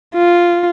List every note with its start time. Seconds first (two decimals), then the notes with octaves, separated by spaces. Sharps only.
0.15 F4